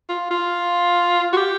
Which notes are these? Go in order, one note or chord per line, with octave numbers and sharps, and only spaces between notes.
F4
F4
F#4
G4